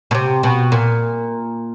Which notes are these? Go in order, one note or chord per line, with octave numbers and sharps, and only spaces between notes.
B2
C3
B2
A#2